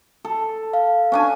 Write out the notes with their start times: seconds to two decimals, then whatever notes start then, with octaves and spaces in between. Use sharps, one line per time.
0.25 A4
0.74 F5
1.12 C#4 D4 G#5